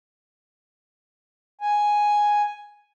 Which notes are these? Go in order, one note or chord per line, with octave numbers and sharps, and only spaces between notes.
G#5